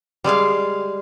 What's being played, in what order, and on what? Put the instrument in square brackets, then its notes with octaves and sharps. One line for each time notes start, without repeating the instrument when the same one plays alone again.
[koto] G3 G#3 G#4 F5